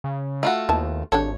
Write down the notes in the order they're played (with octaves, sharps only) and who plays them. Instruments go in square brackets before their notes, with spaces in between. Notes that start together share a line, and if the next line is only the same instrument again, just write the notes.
[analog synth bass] C#3
[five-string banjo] A3 F4 F#4
[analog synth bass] D#2 [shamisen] B3 E4 A5
[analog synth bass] G#1 [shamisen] D4 G4 A4 [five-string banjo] C#5